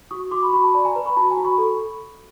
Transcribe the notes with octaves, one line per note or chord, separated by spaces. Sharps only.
F#4 C#6 D#6
F#4 C6 D6
B5 C#6
F#4 B5 C#6
A5 B5
D5 A5 B5
G#5 A#5
B4
B5 C#6
F#4 A5 B5
G#5 A#5
F#4
B5 C#6
A4